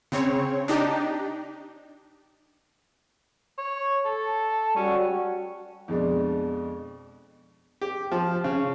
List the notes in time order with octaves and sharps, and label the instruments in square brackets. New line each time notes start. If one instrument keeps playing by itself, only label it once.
[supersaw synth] C#3 C4 C#5
D4 D#4 G4
[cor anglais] C#5
A4
[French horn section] G3 F#4 [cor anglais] C#4
[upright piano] F2 B2 G#3 D4
[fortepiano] G4
F3
C#3